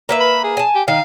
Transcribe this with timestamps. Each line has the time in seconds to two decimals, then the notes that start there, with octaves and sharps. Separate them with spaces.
0.09 A#3 B4 E5
0.20 B5
0.44 G#4
0.57 G#5 A5
0.75 G4
0.88 D#3 F5